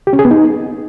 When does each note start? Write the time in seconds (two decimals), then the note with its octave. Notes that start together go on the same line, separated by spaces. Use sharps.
0.07 G4
0.13 C#4
0.19 G#4
0.25 B3
0.31 D#4